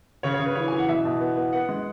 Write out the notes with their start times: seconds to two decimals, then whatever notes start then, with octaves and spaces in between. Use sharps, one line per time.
0.23 C#3 C#5
0.34 C#5
0.40 C#3
0.46 B4
0.56 E3 C#5
0.68 E3 G#5
0.79 F#5
0.88 B2 E5
1.05 B2
1.21 B3
1.36 B3
1.53 B3 F#5
1.69 G#3